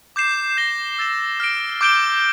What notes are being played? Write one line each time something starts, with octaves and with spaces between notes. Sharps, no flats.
D6 G6 C7 E7
G6 A#6 E7 G7
E6 A6 E7
F6 A#6 D7
D6 G6 D7 G7